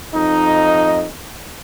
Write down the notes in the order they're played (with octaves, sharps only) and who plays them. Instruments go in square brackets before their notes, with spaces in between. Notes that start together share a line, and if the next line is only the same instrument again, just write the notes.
[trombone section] F2 D#4